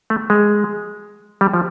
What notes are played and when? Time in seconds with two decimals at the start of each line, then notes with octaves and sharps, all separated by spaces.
0.10 A3
0.30 G#3
1.41 G3
1.54 F3